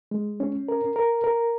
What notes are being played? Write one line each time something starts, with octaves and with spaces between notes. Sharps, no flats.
G#3
C#4
A#4
A#4
A#4